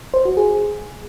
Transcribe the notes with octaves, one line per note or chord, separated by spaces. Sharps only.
C5
F#4
G#4